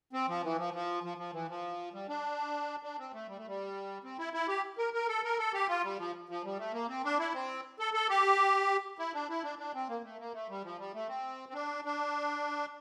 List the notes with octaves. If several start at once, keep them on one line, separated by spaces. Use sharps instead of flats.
C4
F3
E3
F3
F3
F3
F3
E3
F3
G3
D4
D4
C4
A3
G3
A3
G3
C4
E4
E4
G4
A#4
A#4
A4
A#4
A4
G4
F4
G3
F3
F3
G3
A3
A#3
C4
D4
E4
C4
A4
A4
G4
E4
D4
E4
D4
D4
C4
A#3
A3
A#3
A3
G3
F3
G3
A3
C4
C4
D4
D4